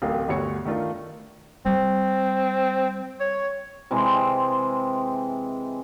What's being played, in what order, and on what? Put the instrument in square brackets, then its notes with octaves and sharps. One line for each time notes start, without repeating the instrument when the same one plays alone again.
[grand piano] D1 A1 A#4 F5
G1 D2 G2 F#4 C#5 C#7
D#3 A3 D4 F4 A#4
[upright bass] G3 [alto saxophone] C4
[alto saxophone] C#5
[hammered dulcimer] C3 E3 G#3 C4